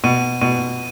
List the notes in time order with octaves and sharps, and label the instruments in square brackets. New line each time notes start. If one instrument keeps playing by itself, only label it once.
[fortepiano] B2 [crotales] D#7
[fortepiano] B2 [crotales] D#7